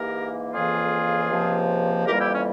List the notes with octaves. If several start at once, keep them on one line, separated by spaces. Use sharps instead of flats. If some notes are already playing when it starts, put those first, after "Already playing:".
Already playing: G#2 E3 A#3 G4 A#4
F2 C#3 E3 A#3 F4 G#4
C#2 C3 F3 A#3
F2 E3 G3 A#3 G4 A#4
E4 G4
C#4